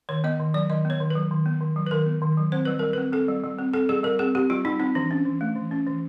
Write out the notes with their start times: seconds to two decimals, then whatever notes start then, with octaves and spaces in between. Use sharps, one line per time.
0.09 D#3 C#5
0.24 B3 D#5
0.39 D#3
0.54 F#3 D5
0.70 D#3 D#5
0.85 B3
0.90 C#5
1.00 D#3
1.10 F#3 B4
1.31 D#3
1.46 B3
1.61 D#3
1.76 F#3
1.87 B4
1.91 D#3 A#4
2.06 B3
2.22 D#3
2.38 F#3
2.52 C4 C5
2.65 G3 B4
2.79 G3 A#4
2.93 C4 B4
3.13 C4 A4
3.28 G3
3.44 G3
3.59 C4
3.73 C4 A4
3.89 G3 G#4
4.04 G3 A#4
4.19 C4 G#4
4.35 C4 G4
4.50 G3 F4
4.65 G3 D#4
4.80 C4 D#4
4.95 E3 D4
5.11 C#4
5.26 E3
5.41 A3
5.56 E3
5.71 C#4
5.87 E3